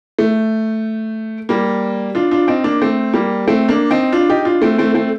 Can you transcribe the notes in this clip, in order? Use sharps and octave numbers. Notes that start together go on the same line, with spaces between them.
A3
G3 A#3
D4 F4
D4 F4
C4 D#4
A#3 D4
A3 C4
G3 A#3
A3 C4
A#3 D4
C4 D#4
D4 F4
D#4 G4
D4 F4
A3 C4
A3 C4
A3 C4